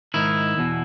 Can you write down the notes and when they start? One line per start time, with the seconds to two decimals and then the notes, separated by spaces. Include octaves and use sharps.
0.14 G#2 D#3 E4
0.58 E2 B2